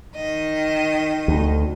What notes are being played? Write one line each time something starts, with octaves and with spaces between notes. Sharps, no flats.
D#3 D#5
D2